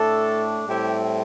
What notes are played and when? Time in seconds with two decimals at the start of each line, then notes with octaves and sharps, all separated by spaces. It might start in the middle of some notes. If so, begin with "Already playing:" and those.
Already playing: A2 A3 D4 A4
0.66 A2 G3 C4 E4 G4